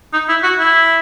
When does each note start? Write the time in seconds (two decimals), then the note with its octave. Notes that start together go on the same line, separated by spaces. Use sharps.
0.13 D#4
0.29 E4
0.43 F#4
0.59 E4